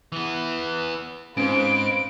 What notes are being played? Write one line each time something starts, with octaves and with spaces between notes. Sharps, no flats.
E3 B3
G#2 C4 C#4 F4 B4 C5 D7